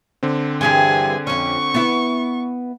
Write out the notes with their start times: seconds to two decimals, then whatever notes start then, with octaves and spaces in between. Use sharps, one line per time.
0.23 D3 C4
0.61 G2 E3 G4 G#4 G#5
1.27 F2 C#4 C#6
1.74 B3 E4